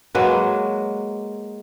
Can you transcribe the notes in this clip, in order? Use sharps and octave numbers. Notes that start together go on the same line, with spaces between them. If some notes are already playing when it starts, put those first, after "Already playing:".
F#3 G#3 A#3 B4